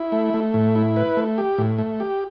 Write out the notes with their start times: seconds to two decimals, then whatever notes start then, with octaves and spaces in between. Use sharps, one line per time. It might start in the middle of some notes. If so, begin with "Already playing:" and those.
Already playing: E4
0.12 A3
0.34 A3
0.54 A2
0.75 E4
0.96 B4
1.17 A3
1.38 G4
1.58 A2
1.78 A3
2.00 G4